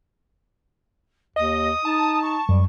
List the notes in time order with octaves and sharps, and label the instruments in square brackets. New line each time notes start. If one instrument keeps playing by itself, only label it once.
[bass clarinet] D#2 [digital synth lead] D#5 [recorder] D#6
[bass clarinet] D#4 [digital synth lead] A5
[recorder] C#6
[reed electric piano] F#2 [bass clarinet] G3